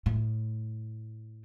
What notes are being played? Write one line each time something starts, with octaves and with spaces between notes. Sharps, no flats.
A2